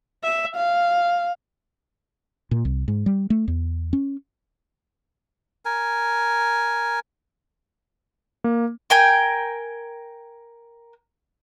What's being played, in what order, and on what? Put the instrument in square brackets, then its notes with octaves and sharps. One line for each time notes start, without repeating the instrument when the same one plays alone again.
[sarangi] E5
F5
[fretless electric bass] A#2
C2
G#2
G3
A3
E2
C#4
[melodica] A#4 G#5
[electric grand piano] A#3
[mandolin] A#4 G5 G#5